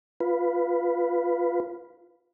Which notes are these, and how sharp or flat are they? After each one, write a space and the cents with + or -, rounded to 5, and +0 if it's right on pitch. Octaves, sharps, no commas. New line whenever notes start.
F4 +0 B4 +0